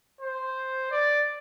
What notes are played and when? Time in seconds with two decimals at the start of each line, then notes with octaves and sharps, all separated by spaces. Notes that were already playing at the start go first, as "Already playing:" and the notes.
0.21 C5
0.91 D5